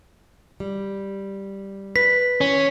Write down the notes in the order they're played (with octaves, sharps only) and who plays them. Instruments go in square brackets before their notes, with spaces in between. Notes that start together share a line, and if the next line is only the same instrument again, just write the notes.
[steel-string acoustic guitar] G3
[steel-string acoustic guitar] B4 [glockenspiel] B6
[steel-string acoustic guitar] E3 [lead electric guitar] C#4